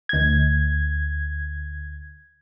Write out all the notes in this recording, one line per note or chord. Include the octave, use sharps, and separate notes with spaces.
D2 G#6